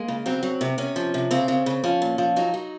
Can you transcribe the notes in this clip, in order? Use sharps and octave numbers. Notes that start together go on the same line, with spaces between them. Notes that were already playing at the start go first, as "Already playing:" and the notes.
Already playing: G#3 A#3
C#3
F#3 C4
F#3
C3
C3 C#4
F3
C3
C#3 C4
C#3
C#3
F3 C#4
A#2
F3
F#3 D#4
F#3